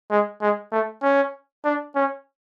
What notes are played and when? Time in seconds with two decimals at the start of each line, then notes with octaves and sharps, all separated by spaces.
0.11 G#3
0.42 G#3
0.72 A3
1.03 C#4
1.65 D4
1.96 C#4